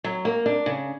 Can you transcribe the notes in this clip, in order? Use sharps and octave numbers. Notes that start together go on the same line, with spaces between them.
F#3
A#3
D4
C#3